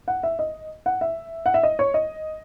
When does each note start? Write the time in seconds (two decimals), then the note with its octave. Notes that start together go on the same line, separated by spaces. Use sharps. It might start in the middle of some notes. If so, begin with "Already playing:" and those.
0.08 F#5
0.23 E5
0.39 D#5
0.86 F#5
1.01 E5
1.46 F#5
1.54 E5
1.63 D#5
1.79 C#5
1.94 D#5